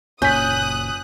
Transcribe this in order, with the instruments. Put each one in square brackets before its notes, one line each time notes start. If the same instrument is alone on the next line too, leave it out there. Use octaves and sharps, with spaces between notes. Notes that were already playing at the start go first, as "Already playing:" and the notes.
[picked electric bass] F#1 A#2 [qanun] C#4 [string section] D#6 F#6 [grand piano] G6 B6